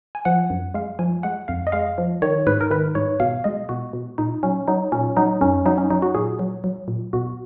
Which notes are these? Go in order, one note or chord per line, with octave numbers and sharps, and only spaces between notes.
G#5
F3 F#5
F#2
G#3 F5
F3 G#5
G#3 F#5
F2 F5
D#5
G#3 F5
F3
D#3 C#5
G#2 B4
A#4
D#3 B4
G#2 C#5
B2 F5
G#3 D#5
B2 F#4
B2
A#2 D#4
F#3 C#4
F#3 D#4
A#2 C#4
F#3 D#4
F#2 C#4
F#3 D#4
C#4
F#3 D#4
F#4
A#2 G#4
F#3
F#3
A#2
B2 F#4